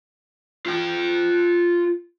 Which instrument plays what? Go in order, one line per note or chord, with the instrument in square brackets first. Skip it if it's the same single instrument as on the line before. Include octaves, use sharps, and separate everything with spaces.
[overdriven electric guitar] F4 G5